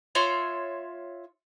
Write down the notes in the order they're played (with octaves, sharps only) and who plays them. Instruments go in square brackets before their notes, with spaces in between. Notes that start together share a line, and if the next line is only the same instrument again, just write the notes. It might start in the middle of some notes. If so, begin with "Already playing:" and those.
[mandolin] F4 C#5 E5 C6